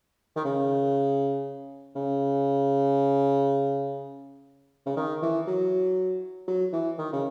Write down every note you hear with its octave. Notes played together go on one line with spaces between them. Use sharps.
D#3
C#3
C#3
C#3
D#3
E3
F#3
F#3
E3
D#3
C#3